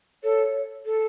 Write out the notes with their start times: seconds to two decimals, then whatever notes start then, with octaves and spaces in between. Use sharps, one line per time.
0.24 A4 C#5
0.86 A4